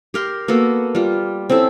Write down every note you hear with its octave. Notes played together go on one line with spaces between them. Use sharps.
G4 A#4 C6
A#3 B3 F#4 A4
G3 F4
C4 C#4 E4 A4